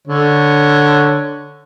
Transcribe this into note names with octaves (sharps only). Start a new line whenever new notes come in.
D3 C#5